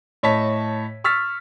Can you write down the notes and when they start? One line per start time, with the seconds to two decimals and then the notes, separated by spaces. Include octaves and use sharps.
0.23 A2 C#5 D#5 A5 B6
1.04 C#6 E6 F6 A6 B6